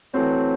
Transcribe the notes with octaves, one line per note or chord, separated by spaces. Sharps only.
E3 F#3 A3 C4